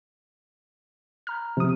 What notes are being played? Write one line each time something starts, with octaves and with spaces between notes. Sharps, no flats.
A#5 F6
C3 F3 D#6